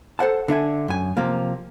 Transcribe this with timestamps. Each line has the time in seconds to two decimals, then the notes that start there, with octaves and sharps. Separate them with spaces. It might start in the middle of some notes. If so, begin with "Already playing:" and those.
0.19 A4 C5 F#5 A5
0.48 D3 D4 E5 G#5
0.88 F#2 G#5
1.17 C3 F3 A#3